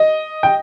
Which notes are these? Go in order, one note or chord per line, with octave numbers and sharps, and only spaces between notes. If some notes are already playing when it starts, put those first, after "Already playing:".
Already playing: D#5
G5